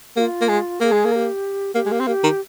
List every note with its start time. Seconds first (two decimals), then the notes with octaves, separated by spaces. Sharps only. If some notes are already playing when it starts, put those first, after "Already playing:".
0.16 A#3 G4
0.20 F4
0.41 A#3
0.48 G#3
0.80 A#3 G#4 A#4
0.92 G#3
1.05 A#3
1.12 A#4
1.16 G4
1.75 A#3 G4
1.86 G#3
1.92 A#3
2.00 C4
2.07 A#3 G4
2.24 D#3